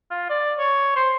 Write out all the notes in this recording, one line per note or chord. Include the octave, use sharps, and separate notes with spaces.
F4
D5
C#5
C5